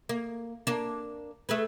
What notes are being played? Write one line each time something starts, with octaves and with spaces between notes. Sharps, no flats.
A#3
A#3 D4
A3 G#4 B4